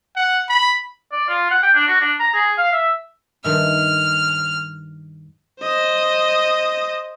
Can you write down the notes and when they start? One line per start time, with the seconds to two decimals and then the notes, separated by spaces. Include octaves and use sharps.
0.16 F#5
0.49 B5
1.12 D5
1.29 F4
1.51 F#5
1.63 G5
1.74 D4
1.88 F#4
2.01 D4
2.19 A#5
2.34 G#4
2.58 F5
2.73 E5
3.44 G2 D#3 E5 F6
5.61 C5 D#5